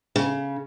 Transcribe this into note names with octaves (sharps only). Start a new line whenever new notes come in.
C#3